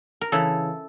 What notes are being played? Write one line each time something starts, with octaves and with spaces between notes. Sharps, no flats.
A#4
C#3 E3 A4